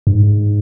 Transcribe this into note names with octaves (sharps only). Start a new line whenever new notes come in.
G2
G#2